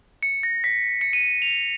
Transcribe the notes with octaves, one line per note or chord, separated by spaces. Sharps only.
C#7
A#6
B6
C#7
D#7
F7